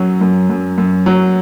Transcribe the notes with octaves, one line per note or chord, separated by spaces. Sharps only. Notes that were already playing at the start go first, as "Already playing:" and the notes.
Already playing: F#2 F#3 C#4
F#2
F#2
F#2
F#3